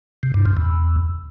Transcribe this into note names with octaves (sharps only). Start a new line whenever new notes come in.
C3
G2
F2
E2